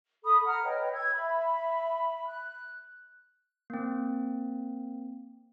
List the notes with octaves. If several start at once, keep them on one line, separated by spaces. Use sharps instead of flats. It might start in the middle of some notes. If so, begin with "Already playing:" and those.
A4 B5 D#6
F#5 A#5 F6
B4 C#5 D#5 G5
E6 G#6
E5 B5
F#6
A#3 C4